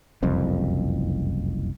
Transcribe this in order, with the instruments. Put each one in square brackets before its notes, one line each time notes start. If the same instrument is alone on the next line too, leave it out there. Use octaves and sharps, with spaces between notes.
[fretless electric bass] F#1 C2 F2